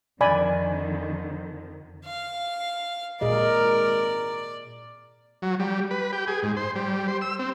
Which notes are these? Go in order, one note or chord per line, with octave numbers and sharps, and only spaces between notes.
F2 D3 D#3 D5 G#5 B5
F5
G#1 A#2 G#4 A#4 D5 D#5
F#3
G3
B4
G4
G#4
G#2
C5
G3
C5
E6
C4